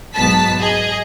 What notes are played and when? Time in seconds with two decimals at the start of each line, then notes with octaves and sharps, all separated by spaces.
0.15 B1 G#2 B3 A5 B6
0.60 G#4 D#5